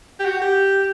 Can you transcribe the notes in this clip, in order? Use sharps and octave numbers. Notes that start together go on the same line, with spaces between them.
G4
F#4
G4